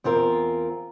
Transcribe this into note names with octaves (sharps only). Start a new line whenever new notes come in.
E2 C4 F4 A#4